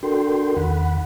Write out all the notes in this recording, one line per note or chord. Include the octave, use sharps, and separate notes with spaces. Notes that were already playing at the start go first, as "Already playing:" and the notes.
D4 F#4 A4 A#4 G5 C6
E2 D#3 F#5 B5